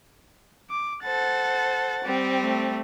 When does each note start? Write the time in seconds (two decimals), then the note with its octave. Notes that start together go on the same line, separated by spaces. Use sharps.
0.70 D6
1.04 A4 C5 F#5 A6
2.04 G3 C4
2.41 A3